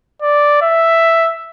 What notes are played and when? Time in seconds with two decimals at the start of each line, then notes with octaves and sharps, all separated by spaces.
0.22 D5
0.62 E5